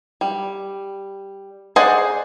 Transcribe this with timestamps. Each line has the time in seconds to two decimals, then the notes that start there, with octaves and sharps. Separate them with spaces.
0.21 G3
1.76 G#4 C5 D5 D#5 F#5